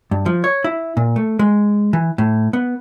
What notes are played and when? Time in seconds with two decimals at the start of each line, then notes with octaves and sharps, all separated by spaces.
0.11 G2
0.26 F3
0.44 C#5
0.64 E4
0.97 A#2
1.16 A3
1.39 G#3
1.93 E3
2.18 A2
2.53 B3